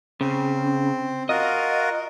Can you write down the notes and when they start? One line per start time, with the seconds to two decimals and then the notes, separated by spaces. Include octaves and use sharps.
0.21 C#3 C4
1.29 F4 F#4 A#4 D#5